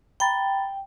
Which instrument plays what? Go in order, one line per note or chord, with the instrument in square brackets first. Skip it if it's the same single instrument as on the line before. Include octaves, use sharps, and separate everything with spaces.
[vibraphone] G5 [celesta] A#5 B5 A6